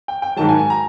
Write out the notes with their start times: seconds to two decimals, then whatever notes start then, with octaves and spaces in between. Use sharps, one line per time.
0.08 G5
0.22 G5
0.37 G#2 D#3 F#3 A5
0.49 G#5
0.59 G#5
0.70 A#5